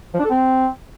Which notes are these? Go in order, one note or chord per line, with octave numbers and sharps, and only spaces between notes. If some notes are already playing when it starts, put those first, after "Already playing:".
F3
D4
A4
C4